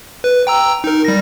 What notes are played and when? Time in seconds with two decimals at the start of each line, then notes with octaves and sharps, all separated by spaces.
0.24 B4
0.47 G5 A#5 E6
0.84 D#4 A#4
1.05 G3 A#6